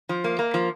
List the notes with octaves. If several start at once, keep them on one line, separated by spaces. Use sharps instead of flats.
F3
A#3
A#3
F3